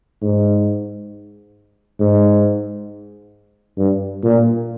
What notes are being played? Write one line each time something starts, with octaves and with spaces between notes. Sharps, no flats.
G#2
G#2
G2
A#2